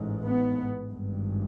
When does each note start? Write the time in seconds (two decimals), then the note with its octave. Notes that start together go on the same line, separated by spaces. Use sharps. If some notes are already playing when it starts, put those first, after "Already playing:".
Already playing: A1 G#2
0.25 B3
0.92 G#1 G2